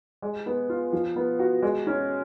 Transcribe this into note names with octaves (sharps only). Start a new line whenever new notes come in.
G#3
B3
F4
F3
B3
F#4
G#3
C#4